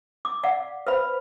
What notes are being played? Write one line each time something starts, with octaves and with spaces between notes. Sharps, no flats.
D6
D5 F5 F#5
B4 C5 F5 B5